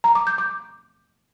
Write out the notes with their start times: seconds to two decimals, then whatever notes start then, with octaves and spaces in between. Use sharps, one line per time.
0.04 A#5
0.15 D6
0.27 G6
0.38 D6